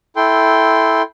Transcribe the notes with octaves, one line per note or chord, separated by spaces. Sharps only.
E4 A4 G5 C6